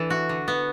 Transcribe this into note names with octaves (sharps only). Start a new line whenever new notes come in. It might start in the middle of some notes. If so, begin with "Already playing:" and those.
Already playing: E3 D4 A4
F#4
D3
B3